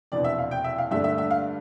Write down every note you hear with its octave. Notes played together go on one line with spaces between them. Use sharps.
F1 E2 B2 B3 D4 D5
E5
F5
G5
E5
F5
G2 D3 A3 D4 E5
E5
E5
F5